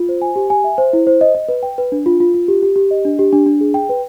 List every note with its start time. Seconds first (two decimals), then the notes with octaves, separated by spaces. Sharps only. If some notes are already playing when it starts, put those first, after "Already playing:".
Already playing: F4
0.09 C5
0.22 G#5
0.36 G4
0.50 G#5
0.64 E5
0.78 C5
0.93 E4
1.07 C5
1.21 D#5
1.35 D#5
1.49 B4
1.63 G5
1.78 B4
1.92 D4
2.06 F4
2.20 F4
2.34 F4
2.48 G4
2.63 G4
2.76 G4
2.91 D#5
3.05 D4
3.19 G4
3.33 D4
3.46 D4
3.61 G#4
3.74 G5
3.89 B4